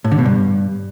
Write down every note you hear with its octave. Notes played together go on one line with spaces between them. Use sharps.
A2
D3
B2
G2